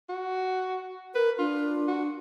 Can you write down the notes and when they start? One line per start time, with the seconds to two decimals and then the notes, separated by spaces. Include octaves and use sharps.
0.09 F#4
1.15 A#4 B4
1.39 D4 F4
1.88 F#4